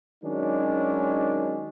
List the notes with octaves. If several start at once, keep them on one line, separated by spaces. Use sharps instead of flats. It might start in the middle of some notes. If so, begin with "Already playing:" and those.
D#3 F#3 G#3 C#4 D4